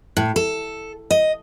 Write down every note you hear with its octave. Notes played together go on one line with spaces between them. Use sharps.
A2
A4
D#5